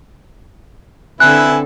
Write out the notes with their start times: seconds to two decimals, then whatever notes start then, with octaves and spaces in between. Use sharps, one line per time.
1.20 D3 C4 E4 A4 B4 G#5 F#6